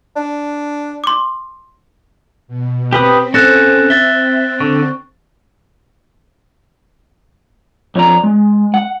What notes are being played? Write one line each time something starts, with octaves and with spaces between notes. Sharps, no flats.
D4
C6 D6
B2
C4 G4 B4 D#6
C#4 A4 C5 F#6 A6 A#6
E5 A6 G7
D3 C#6
F2 C#5 D5 A#5
G#3
F#5